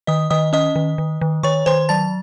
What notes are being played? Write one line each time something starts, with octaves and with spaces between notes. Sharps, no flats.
D#3 D#5 D#6
D#3 D#5 D#6
C#4 D#5 D#6
D#3
D#3
D#3
D#3 C#5 C#6
D#3 C5 C6
F#3 A5 A6